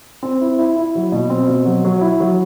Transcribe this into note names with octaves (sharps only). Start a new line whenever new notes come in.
C4
E4
E4
E4
F#3
B2
C4
B2
F#3
F#3
E4
F#3